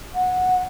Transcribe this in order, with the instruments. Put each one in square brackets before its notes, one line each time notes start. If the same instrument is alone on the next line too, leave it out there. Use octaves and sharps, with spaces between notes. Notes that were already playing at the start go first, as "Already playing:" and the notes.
[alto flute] F#5